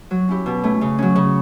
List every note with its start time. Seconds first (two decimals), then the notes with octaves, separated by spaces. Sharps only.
0.11 F#3
0.29 C#4 E4 G4
0.46 B2
0.63 A3 C#4
0.81 C#3
0.99 F#3 C#4
1.16 C#3